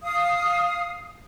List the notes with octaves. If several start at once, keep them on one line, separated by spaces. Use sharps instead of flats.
F5 D#6